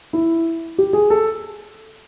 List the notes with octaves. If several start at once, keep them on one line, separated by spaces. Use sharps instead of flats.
E4
G4
G#4
A4